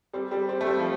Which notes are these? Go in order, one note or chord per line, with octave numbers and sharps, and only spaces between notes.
G3 C4
G3 C4
G3 C4
A3
G3 C4
F3